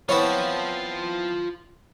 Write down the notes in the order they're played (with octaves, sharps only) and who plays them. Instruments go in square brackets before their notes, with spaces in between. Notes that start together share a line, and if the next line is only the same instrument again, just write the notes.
[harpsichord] B3 C4 E4 [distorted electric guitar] F4 A5 [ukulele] C#5